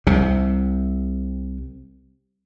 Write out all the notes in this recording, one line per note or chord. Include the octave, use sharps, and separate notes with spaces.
C2 C3